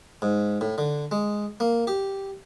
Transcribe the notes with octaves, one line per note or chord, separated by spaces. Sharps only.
G#2
A2
D3
G#3
A#3
G4